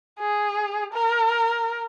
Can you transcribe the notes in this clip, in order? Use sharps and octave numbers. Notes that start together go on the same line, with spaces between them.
G#4
A#4